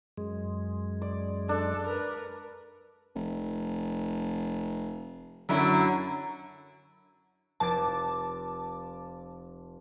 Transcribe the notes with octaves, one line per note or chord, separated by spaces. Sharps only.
F#2 G#3
D5
D4 A4
A#4 B4
F1
F#2 D3 F#3 E4
F1 A5 D6 A6